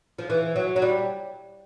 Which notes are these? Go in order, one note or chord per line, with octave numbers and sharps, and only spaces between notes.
F3
E3
F#3
F#3
G3